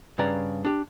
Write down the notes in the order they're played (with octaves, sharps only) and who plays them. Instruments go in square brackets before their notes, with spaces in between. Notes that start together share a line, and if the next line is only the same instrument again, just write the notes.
[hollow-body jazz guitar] G2 C#3 B4 C#5 D5 A#5
D4 G4